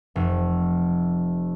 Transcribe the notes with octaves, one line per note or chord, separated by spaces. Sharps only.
F1